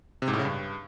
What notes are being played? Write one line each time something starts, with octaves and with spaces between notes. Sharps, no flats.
C3
G#2
A2
C#3
G2